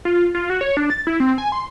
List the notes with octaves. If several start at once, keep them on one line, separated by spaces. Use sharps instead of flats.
F4
F4
F#4
C#5
D4
A6
E4
C4
G#5
C6